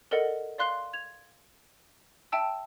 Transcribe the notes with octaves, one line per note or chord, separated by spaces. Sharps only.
A4 A#4 D5 D#5 F#5
D5 F5 C6 F#6 C7 G7
G#6 F7
E5 G5 A5 E6